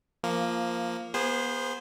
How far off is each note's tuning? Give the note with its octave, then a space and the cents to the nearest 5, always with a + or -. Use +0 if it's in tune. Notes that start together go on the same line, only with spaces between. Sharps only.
F3 -10 A#3 +0
B3 -30 G#4 -25 C5 +0